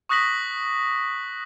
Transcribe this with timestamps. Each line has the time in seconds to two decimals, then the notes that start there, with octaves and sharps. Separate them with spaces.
0.09 C#6 D#6 F#6 A#6 B6 F#7